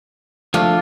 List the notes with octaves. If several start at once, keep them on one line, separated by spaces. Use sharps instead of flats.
F3 A3 D4 F4